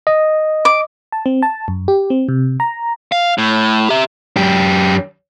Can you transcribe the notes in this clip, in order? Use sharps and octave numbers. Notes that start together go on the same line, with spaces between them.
D#5
D6
A5
C4
A5
F#2
G4
C4
C3
A#5
F5
A2
G4 E5
F#2 G4